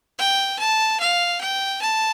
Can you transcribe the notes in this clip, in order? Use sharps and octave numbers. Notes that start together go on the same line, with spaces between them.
G5
A5
F5
G5
A5